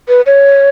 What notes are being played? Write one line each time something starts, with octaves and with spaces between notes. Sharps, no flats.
B4
C#5